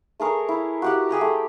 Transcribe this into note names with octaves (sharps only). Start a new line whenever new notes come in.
A3 G#4 A#4 C#5
E4
F#4 G4 F#5
G4 G#4 G5 A#5
A3